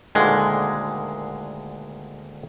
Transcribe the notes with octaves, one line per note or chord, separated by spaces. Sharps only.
D2 A#2 D3 D#3 G#3